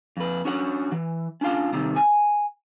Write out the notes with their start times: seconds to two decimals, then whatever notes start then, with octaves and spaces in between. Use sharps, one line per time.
0.17 F2 B4
0.45 C#4 D4 F#4 C#5 F#5
0.92 E3
1.41 C#4 D4 F4 F5 G5
1.73 C3 D#3 G3 C4
1.96 G#5